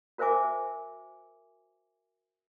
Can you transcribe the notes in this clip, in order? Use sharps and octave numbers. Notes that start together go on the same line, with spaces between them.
F#4 A#4 C5 E5 G#5 D6